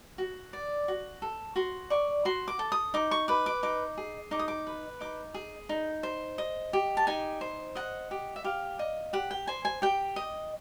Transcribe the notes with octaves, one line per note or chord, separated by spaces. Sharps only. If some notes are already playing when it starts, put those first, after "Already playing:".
F#4
D5
F#4
A4
F#4 C6
D5 C#6
F#4 C6
D6
A4
D#6
D#4 D6
C#6
B4 D6
D6
D#4 D6
G#4
D#4 D6
D#6
D6
B4
D#4 D6
G#4
D#4
C5
D#5
G4
A5
D#4 G#5
C5
D#5 F#5
G4
E5
G4 F5
D#5
G4 F#5
G5
C5 G#5
G#5
G4 G5
D#5